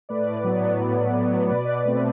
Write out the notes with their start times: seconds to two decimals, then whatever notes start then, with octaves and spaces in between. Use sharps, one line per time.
0.09 A2 B4 D5
0.44 F#3 B3
0.80 A2
1.15 F#3 B3
1.50 B2 B4 D5
1.85 A3 C4